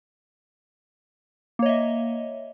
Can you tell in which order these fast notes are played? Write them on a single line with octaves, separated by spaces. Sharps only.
A#3 C#5 D#5 E5